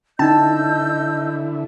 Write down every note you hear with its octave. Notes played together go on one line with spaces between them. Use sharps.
D3 C#4 D#4 E4 D#5 A5 E6 G6